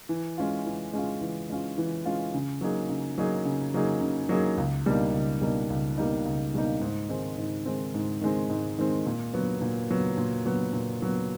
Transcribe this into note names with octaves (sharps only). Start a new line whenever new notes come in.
E3
G#3 C#4 F4
E3
G#3 C#4 F4
E3
G#3 C#4 F4
E3
G#3 C#4 F4
C#3
F#3 A#3 D#4 G#4
C#3
F#3 A#3 D#4 G#4
C#3
F#3 A#3 D#4 G#4
C#3
F#3 A#3 D#4 G#4
C#2
B2 G3 A#3 D#4
C#2
B2 G3 A#3 D#4
C#2
B2 G3 A#3 D#4
C#2
B2 G3 A#3 D#4
G#2
D#3 G#3 C4
G#2
D#3 G#3 C4
G#2
D#3 G#3 C4
G#2
D#3 G#3 C4
A#2
F#3 B3
A#2
F#3 B3
A#2
F#3 B3
A#2
F#3 B3